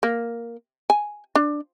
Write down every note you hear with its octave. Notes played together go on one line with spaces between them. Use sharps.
A#3
G#5
D4